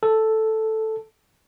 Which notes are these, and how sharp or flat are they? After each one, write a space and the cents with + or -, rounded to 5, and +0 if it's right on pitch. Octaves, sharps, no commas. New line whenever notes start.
A4 +0